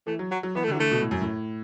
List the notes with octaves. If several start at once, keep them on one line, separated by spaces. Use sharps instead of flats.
E3 A3
F#3
F#3
F#3
E3 B3
A3
D3
E3 F#3
D3 A3
B2
A2
F#2
A2